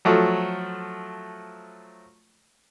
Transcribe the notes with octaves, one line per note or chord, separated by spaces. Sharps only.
F3 F#3 A3